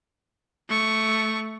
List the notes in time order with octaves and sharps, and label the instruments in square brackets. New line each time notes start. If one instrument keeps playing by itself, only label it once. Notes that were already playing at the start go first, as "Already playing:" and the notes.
[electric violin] A3 C#6